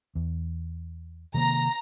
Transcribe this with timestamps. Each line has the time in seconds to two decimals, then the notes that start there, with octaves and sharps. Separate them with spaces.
0.15 E2
1.34 C3 D#3 A#3 A#5